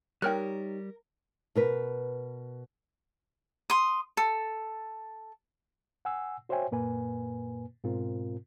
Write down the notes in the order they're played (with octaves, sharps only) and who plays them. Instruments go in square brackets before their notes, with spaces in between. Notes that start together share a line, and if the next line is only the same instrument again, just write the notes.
[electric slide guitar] G3 [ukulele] D#4 G4 C#5 [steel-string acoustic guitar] A#4 [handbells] G5 F6 F#6
[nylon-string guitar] B2 A#4 B4
[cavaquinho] C6 D#6
A4
[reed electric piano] F#5 G#5 E6
F#4 C5 C#5 E5 G5 G#5
F#2 A#2 A#3 B4 G#5
G#2 B2 C4 F4 A#4